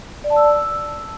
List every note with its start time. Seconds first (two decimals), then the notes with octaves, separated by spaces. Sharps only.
0.24 D5
0.30 A5
0.36 E6